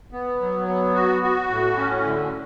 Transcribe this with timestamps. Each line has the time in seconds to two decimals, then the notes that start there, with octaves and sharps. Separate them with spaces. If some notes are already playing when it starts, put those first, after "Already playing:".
0.12 B3
0.41 F#3
0.68 B3
0.95 F#4
1.23 F#4
1.50 A2
1.77 C#4
2.05 D3